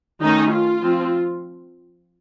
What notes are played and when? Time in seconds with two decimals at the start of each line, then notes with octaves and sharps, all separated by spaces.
0.21 D#3 A3 C#4 D#4
0.51 F4
0.82 F3 C4